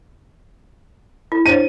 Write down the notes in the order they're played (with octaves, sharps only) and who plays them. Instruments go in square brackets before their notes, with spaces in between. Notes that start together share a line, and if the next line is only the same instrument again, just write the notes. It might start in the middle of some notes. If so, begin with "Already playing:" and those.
[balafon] E4
[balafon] D4 C5 C#5 [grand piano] D#7